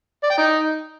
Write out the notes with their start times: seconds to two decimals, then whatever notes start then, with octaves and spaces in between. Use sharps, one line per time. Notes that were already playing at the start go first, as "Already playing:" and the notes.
0.23 D5
0.30 G5
0.37 D#4